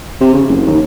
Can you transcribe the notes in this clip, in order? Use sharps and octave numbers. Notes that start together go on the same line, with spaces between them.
C3
C#3
F#1
D#2